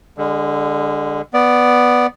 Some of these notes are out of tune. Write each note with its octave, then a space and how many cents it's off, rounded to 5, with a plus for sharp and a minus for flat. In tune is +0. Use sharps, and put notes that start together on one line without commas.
D3 +0 G#3 -40
B3 +0 D5 +0